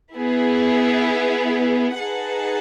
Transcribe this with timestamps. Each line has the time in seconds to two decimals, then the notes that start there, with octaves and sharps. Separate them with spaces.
0.14 B3 E4 G#4
1.96 D#4 G#4 B4 F#5 A5